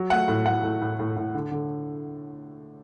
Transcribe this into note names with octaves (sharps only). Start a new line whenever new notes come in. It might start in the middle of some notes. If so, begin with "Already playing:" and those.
Already playing: F#3
A3 F#5
A2
A2 F#5
A2
A2
A2
A2
D3
D3